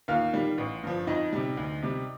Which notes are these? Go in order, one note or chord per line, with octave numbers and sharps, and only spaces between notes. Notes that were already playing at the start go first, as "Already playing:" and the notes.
D#2 F4 F5
D#3 G3
A1
G2 F3
F2 D#4 D#5
C3 G3
D2
C3 G3